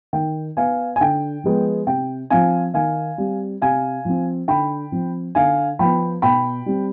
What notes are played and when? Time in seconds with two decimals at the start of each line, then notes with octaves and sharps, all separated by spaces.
0.13 D#3 G5
0.57 B3 F5 G#5
0.96 G#5
1.01 D3 G5
1.44 F3 G#3 B3
1.87 C3 G5
2.30 F3 C4 F5 G#5
2.74 D#3 F5 G#5
3.18 G3 C4
3.62 C3 F5 G#5
4.05 F3 C4
4.48 D3 G5 B5
4.92 F3 C4
5.35 D3 F5 G#5
5.79 F3 B3 G5 B5
6.22 B2 G5 B5
6.66 G3 C4